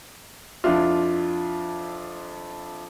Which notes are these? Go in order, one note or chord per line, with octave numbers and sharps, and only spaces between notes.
F2 D4 E4 F4